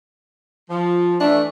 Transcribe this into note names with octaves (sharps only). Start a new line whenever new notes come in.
F3
E3 A3 D4